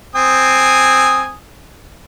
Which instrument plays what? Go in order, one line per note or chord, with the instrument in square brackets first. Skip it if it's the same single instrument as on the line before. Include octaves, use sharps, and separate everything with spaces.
[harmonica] C4 G#5 D#6